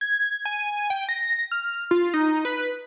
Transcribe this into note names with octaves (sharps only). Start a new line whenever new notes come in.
G#6
G#5
G5
A#6
F6
F4
D#4
B4